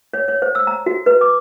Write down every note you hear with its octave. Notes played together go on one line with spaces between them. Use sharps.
C#5
C#5
C5
E6
A#5
F#4
B4
D6